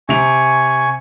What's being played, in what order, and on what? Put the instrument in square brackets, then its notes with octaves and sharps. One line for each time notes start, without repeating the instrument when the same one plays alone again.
[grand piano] C3 D7 F7 [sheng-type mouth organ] G#5 C#6